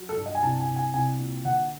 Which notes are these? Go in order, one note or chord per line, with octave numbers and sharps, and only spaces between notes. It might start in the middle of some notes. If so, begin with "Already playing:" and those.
Already playing: F#3
A4
G2
D#5
G#5
C2 A5
G#5
C2
G#5
C2 G#5
A#2
D3 F#5